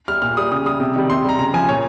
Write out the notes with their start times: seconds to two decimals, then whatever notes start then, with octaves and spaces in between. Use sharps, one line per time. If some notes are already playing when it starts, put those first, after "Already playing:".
0.08 G3 F6
0.22 A#2 F6
0.37 G3 D#6
0.52 C#3 D#6
0.66 G3 D#6
0.80 C3
0.96 D#3 G3
1.10 C3 C6
1.25 G3 A#5
1.39 C#3 A#5
1.54 F3 G#5
1.68 A#2 C#5